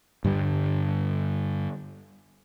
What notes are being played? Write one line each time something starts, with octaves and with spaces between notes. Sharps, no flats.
G2 D3 G3